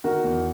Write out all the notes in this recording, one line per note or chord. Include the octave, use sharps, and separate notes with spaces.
D#3 F#4 A#4
E2